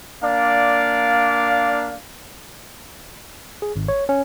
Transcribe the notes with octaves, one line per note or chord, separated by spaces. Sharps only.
A#3 D4 D5 F5
G#4
G#1
C#5
C#4